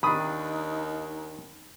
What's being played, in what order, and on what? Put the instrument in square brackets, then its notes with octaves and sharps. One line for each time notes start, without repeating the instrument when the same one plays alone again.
[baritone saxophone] D#2 [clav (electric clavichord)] D#3 D4 [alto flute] D#4 [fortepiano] B5 D#6